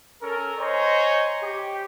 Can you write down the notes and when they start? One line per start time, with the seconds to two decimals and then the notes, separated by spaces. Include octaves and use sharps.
0.21 C#4 A4 A#4
0.59 C5 C#5 D#5 G#5 A#5
1.43 G4